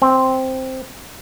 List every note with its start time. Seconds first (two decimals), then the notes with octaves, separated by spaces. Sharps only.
0.02 C4